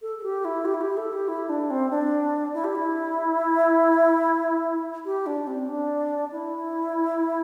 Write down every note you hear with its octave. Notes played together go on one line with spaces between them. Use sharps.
A4
A4
G4
E4
G4
E4
G4
A4
G4
E4
D4
C4
D4
E4
G4
E4
G4
D4
C4
D4
E4